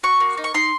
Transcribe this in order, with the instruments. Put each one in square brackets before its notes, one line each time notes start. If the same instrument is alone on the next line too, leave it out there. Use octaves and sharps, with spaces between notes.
[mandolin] F#4 C#6
A#3
D#4
C#6
D#4 C6